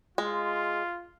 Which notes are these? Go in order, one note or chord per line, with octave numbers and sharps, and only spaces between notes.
G#3 F4